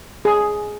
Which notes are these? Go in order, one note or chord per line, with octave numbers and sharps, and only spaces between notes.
G#4